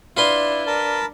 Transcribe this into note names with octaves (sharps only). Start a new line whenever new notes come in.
D4 E4 F4 B4 C6
A#4 A5 B5